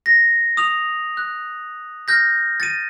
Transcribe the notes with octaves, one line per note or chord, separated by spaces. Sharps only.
A#6
D#6 F7
F#6
F6 G6 A#6
A6 C#7 D#7